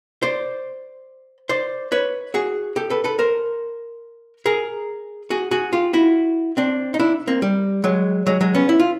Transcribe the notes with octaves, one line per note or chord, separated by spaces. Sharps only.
C5 D5
C5 D5
B4 C#5
F#4 G#4
G4 A4
A4 B4
A4 B4
A#4 C5
G#4 A#4
F#4 G#4
F#4 G#4
F4 G4
E4 F#4
C4 D4
D#4
D4 E4
A#3 C4
G3
F#3 G#3
F#3 G#3
F#3 G#3
B3 C#4
E4
F4